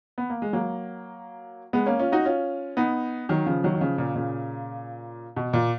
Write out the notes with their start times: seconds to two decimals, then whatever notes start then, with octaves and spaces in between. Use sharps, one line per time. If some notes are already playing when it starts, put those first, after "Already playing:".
0.18 B3
0.30 A#3
0.42 G#3
0.53 F#3 A#3
1.73 G#3 B3
1.86 A#3 C#4
1.99 C#4 F4
2.12 D#4 F#4
2.25 C#4 F4
2.77 B3 D#4
3.29 D#3 F#3
3.46 C#3 F3
3.64 D#3 F#3
3.74 D#3
3.81 C#3 F3
3.98 A#2 C#3
4.15 A#2 C#3
5.36 B2
5.53 A#2